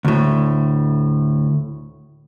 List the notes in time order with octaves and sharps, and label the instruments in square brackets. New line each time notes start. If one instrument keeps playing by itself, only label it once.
[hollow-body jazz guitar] D2 A2